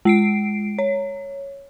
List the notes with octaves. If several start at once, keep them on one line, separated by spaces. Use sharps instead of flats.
G#3 C7 D7
C#5